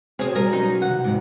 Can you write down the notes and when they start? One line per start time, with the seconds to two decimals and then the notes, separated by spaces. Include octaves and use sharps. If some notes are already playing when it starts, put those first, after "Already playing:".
0.19 B2 C4 G#4 C5 C#5 D#6
0.35 G3 A4 A#4 G#5 A#5
0.53 F#3 G3 C#4 D#4 F4
0.82 F1 D#3 F#5
1.04 F1 E2 G#2 C3